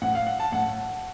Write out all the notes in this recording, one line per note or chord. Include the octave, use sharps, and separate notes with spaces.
A2 F#5
F5
F#5
A5
A2 F#5